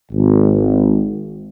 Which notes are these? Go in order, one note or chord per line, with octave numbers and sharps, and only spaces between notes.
G#1